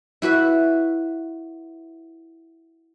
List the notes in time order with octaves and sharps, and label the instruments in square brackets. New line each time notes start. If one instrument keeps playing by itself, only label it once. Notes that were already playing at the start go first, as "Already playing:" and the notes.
[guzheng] E4 F#4 B4 E5